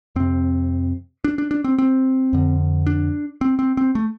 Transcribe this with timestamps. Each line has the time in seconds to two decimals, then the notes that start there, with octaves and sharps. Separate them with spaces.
0.16 F2 C3 C4
1.24 D4
1.38 D4
1.51 D4
1.64 C4
1.78 C4
2.33 F2 D3
2.87 D4
3.41 C4
3.59 C4
3.77 C4
3.95 A3